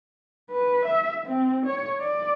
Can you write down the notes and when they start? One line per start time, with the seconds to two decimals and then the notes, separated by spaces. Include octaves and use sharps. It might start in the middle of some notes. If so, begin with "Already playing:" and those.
0.51 B4
0.86 E5
1.27 C4
1.66 C#5
2.00 D5